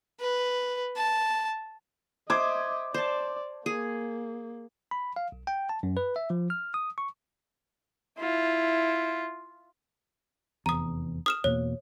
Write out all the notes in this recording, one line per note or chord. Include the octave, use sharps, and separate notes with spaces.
B4
A5
C5 D#5 E5 D6 G#6
C5 D5 A5
A#3 G#4
B5
F5
B1
G5
A5
F#2
B4
E5
F3
F6
D#6
C#6
E4 F4
F1 E2 A#5 D#6
D#6 F6 E7
E2 B2 A#3 C#5